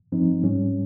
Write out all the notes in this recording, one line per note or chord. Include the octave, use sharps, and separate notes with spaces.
G2 F3 C4 D#4
G#2 G3 C#4